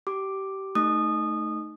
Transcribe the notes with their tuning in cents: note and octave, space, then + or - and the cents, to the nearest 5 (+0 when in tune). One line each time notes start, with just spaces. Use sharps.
G4 -25 D6 +0
A3 +0 D#4 +0 D#6 -20